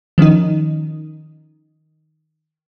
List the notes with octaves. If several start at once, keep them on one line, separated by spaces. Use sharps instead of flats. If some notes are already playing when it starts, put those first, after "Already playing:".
D#3 F3 C#4 D#4